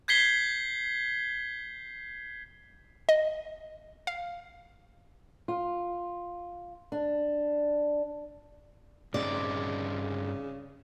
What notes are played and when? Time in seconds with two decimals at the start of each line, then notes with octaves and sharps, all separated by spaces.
0.08 G6 G#6 B6 C7 G7
3.09 D#5
4.07 F5
5.48 F4
6.92 D4
9.14 G2 C#3 C4 D#4 D5